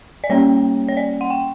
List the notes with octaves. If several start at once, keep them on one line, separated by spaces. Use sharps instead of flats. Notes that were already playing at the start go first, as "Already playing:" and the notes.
D5
G3 A#3 C#4 C#5
C#5
D5
F#5
G5